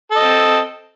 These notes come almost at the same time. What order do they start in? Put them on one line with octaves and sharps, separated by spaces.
A4 D#5 C4